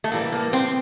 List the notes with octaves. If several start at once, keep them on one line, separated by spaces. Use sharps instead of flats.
A3
A2 E3 G3 A#3
A#3
C4